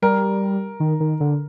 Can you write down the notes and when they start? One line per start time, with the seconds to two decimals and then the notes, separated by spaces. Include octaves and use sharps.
0.02 G3 A#4
0.80 D#3
1.00 D#3
1.20 D3